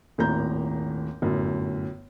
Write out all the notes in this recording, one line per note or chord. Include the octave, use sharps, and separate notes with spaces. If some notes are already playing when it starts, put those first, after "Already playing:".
D#1 G#1 A2 A#5 G6
G1 F#2 A2